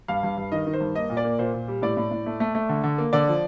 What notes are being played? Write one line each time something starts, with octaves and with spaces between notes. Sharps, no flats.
G2 F5
G2
G2
D#3 D#5
D#3
C5
G2
A#3 D#5
A#2
D5
A#3
A#2 C5
A#2
G3
A2 D5
A2
A2
A3
A3
A3
D3
D3
A#3
D3 D5
F3